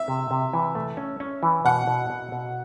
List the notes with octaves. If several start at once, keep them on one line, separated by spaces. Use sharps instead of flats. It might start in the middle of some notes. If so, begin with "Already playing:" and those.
Already playing: E5
C3
C3
E3
A3
C#4
C#4
E3
B2 F#5
B2
B2
B2